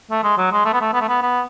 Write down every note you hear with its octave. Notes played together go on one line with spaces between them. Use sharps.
A3
G#3
F#3
G#3
A3
B3
A3
B3
A3
B3
B3